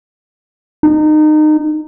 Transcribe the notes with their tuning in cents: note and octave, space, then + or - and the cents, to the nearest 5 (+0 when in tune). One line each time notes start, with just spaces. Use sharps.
D#4 -25